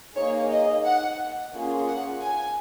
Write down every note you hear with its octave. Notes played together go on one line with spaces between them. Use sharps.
A#3 D#4 G#4 C#5
D#5
F#5
A#3 C#4 F4 G#4
F#5
G#5